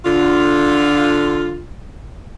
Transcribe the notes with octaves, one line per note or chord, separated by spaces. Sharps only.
D3 F4